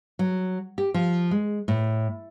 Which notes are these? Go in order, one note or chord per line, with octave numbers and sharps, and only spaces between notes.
F#3
G4
F3
G#3
A2